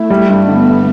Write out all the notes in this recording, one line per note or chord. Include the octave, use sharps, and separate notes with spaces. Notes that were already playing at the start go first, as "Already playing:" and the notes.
Already playing: A3 E4
G3
G2
D3 B3